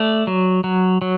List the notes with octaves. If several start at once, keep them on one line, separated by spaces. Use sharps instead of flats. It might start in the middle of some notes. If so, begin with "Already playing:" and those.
Already playing: A3 D5
F#3
F#3
F#3